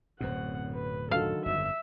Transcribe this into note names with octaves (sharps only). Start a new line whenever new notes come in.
D1 F#2 B2 C4 F#5
B4
D3 D#3 F#3 A4 F5
G1 F2 E5